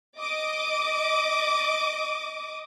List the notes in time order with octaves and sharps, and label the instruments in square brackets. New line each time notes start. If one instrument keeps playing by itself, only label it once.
[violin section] D#5 D6 D#6